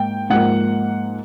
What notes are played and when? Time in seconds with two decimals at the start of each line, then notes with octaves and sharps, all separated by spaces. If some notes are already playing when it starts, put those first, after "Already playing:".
Already playing: G#2 A#3 G5
0.30 G#2 F3 A#3 F#5